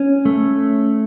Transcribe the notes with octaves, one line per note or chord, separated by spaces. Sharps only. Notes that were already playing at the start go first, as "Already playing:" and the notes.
Already playing: C#4
A3